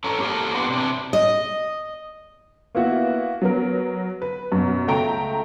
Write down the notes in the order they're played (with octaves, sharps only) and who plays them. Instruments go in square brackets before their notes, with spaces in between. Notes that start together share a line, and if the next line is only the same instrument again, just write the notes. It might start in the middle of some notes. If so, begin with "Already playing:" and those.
[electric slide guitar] C#4 A4 A#5
A#3 G4 A4 A#4 F5
B3 C4 D4
C3 D4
[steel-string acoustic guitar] D#5
[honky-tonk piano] A#3 B3 E4 F#4
F#3 B3 A#4
B4
F#2 B2
C#2 A3 G5 A#5 D7